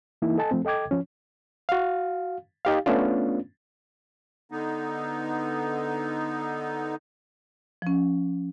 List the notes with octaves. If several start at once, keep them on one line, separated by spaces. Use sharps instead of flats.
E3 A#3 D#4 E4
A4 D#5 G#5 A5
F3 A3 C4
A4 D#5 G5 D6 G#6
F3 C#4
F#4 F5
D#4 G4 F5
A3 B3 C#4 D4 F4
D3 B3 D#4
F3 C#4